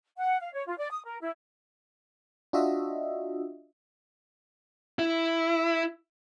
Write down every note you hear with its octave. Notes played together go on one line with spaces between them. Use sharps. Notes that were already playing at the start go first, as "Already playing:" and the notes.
F#5
F5
C#5
F4
D5
D#6
A#4
E4
D4 F4 F#4 D#5 E5
E4